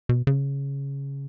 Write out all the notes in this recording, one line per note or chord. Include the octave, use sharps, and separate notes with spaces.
B2
C#3